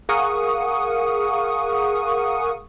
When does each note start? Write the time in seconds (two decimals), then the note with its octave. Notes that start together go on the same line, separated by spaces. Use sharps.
0.09 G#4 A#4 F5 F#5 C#6 D#6